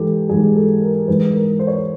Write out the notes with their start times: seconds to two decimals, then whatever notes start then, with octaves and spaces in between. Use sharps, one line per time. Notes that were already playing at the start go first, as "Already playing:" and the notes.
Already playing: G#2 E3 G4 A4
0.29 G#2 E3 G#4
0.56 A4
0.82 A#4
1.08 G#2 E3 B4
1.33 A#4
1.59 C5
1.67 C#5
1.76 C5